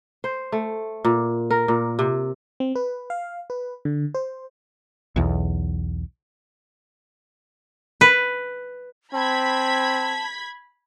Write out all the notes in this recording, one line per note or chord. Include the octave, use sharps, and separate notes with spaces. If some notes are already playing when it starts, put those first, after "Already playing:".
C5
A3
A#2
A#4
A#2
C3
C4
B4
F5
B4
D3
C5
B1 E2
B4
C4 A5 B5 G#6 B6